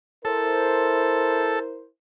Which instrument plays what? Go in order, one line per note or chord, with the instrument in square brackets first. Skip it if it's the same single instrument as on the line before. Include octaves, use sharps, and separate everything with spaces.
[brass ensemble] E4 A#4 C5 [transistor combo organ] A4